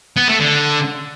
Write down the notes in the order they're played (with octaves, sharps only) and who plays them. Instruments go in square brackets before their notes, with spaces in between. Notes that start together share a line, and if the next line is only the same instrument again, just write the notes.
[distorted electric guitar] B3
A3
D3